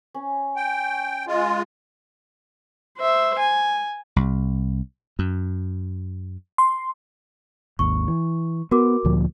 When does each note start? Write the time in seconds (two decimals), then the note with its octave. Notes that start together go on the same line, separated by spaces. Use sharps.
0.14 C#4
0.56 G5
1.27 G#3 F4
2.99 C5 E5
3.39 G#5
4.16 C2
5.19 F#2
6.58 C6
7.79 G#1 D#2 C#6
8.08 E3
8.71 B3 F#4 A#4 D6
9.05 D2 A#2 F3